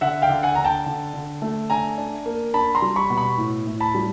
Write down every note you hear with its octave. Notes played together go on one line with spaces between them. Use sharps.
D3 E5 F#5
F5 G5
D3
F#5 G#5
D3 A#5
G5 A5
D3
D3
A3
D4 G#5 A#5
D4
A#3
D4 A5 B5
A#5 C6
G3
B5 C#6
B2
B5 C#6
A2
A2
A5 B5
G3